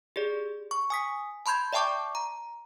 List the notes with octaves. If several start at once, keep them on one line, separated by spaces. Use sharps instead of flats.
G4 G#4 D5
C#6
G#5 D#6 B6
A5 B5 C6 G6 G#6
D5 E5 G5 A5 C#6 D6
A#5